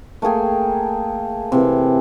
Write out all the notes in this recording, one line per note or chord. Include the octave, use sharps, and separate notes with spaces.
A3 A#3 G#4 G5
C3 E3